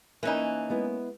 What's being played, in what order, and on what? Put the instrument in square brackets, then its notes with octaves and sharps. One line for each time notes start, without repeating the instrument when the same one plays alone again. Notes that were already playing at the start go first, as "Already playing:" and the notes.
[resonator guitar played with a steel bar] E3 D#4 [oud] A#3 C#4
[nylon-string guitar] G#3 B3 E4